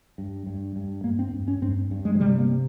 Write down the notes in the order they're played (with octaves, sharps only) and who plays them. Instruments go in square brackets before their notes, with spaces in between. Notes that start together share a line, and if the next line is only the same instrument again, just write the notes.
[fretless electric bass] G2
G2
G2
G2 A#3
C4
G2
C#4
G2 C4
G2
G#3
F3
C3 G3
A#3